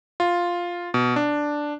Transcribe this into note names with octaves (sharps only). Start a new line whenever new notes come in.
F4
B2
D4